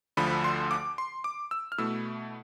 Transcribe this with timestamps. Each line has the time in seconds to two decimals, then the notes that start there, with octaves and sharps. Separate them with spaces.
0.17 D2 D3 F3 B5
0.44 C6
0.71 D6
0.98 C6
1.24 D6
1.51 E6
1.72 F6
1.78 B2 A3 E4 E6